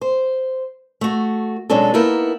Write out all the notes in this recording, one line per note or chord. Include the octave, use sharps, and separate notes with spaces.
C5
A3 F#4
B2 F#3 G#3 C#4 D4 A4
A#3 B3 D#4 E4 A4 A#4